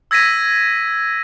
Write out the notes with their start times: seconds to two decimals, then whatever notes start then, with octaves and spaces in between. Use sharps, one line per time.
0.11 E6 G#6 A#6 B6 D#7